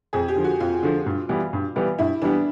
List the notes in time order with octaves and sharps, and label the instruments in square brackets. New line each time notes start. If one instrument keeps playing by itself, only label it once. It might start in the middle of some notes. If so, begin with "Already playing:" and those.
[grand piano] F2 [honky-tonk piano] G#4
[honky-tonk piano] G4
[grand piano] D3 F3
[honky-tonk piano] F#4
[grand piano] F2 [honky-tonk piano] F4
[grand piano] D3 F3
G2
E3 G3 B3
G2
E3 G3 B3
[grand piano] G2 [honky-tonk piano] E4
[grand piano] E3 G3 B3 [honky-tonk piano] D4